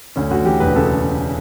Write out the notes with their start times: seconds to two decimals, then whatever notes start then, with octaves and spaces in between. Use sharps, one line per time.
0.16 D2 C#4
0.31 D2 F#4
0.46 E3 G4
0.60 E1 B4
0.75 C#3 A4